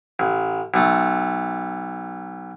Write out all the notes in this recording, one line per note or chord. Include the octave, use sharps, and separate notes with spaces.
A1
B1 A3